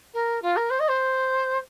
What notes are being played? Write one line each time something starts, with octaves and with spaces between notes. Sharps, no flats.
A#4
F4
A#4
C5
D#5
C5